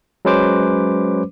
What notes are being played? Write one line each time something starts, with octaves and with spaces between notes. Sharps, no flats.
F#3 G#3 C#4 B4 C5 D6